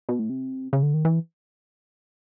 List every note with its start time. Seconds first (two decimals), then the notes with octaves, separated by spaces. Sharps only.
0.09 B2
0.19 A2
0.30 C3
0.73 C#3
0.83 D3
0.94 D#3
1.05 E3